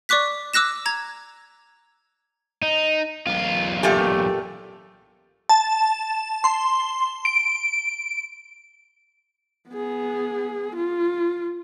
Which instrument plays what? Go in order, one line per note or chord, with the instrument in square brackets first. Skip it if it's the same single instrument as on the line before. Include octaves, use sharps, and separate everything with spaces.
[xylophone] D5 C#6 D6 F#6 B6
D6 E6 F#6 A#6 E7
A#5 G#6
[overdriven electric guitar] D#4
B1 F4
[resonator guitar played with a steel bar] A#2 A3 G4
[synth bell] A5
C6
D7
[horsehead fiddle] B3 G#4
F4